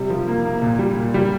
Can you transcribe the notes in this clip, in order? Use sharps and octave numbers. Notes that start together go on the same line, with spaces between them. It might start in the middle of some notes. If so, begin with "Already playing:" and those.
Already playing: C3 G3
F3
A#3
A#3
A#2
G3
A#2
G3